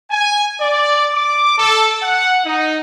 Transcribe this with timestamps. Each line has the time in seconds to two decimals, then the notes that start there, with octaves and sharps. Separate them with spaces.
0.11 G#5
0.61 D5
1.14 D6
1.58 A4
2.03 F#5
2.46 D#4